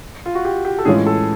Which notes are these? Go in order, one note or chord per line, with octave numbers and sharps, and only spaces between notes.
F4
F#4
G4
G4
A4
A2 E3 G#3 C#4 F4 G#4
A4